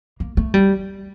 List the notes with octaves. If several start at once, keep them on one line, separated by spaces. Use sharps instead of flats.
A#3
A3
G3